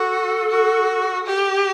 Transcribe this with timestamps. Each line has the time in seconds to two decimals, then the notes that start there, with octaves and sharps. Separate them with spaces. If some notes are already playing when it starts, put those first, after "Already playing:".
Already playing: F#4 A4
0.50 F#4
1.26 G4